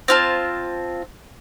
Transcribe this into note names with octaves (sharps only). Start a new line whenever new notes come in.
C4 F4 A5